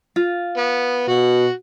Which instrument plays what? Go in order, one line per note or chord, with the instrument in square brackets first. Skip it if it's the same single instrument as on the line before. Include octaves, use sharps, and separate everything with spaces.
[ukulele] F4
[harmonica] B3
[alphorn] B2 [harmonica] F#4